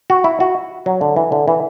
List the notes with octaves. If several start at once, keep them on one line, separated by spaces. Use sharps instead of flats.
F#4
E4
F#4
F#3
D3
E3
D3
E3